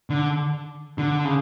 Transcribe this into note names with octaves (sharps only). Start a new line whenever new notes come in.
D3
D3
C#3